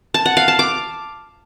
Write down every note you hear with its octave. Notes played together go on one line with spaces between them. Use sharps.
A5
F#5
F5
A5
D6